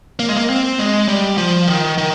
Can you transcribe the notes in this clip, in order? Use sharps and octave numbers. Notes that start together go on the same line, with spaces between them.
A#3
G#3
A#3
C4
G#3
G3
F3
D#3
D#3